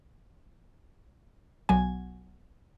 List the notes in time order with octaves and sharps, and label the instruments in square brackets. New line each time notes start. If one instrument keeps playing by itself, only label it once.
[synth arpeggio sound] B1 F#3 G#5